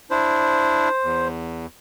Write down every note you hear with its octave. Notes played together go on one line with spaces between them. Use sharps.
D4 E4 C5
E2